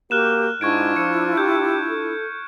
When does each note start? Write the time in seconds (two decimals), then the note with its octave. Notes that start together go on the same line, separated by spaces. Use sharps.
0.11 A#3 F#4 G4 F6 F#6 E7
0.61 G#2 D4 E4 F4 C#6 G#6 D7
0.96 F3 C#7
1.37 G4 G6
1.90 A4